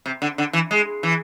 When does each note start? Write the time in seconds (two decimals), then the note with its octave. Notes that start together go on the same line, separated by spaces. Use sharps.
0.06 C3
0.22 D3
0.38 D3
0.53 E3
0.71 G#3
1.03 E3